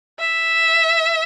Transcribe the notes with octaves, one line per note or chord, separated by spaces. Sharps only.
E5